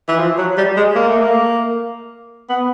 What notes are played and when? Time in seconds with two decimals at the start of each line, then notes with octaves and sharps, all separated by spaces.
0.08 E3
0.19 F3
0.38 F#3
0.57 G3
0.77 G#3
0.95 A#3
1.08 A3
1.21 A#3
2.49 B3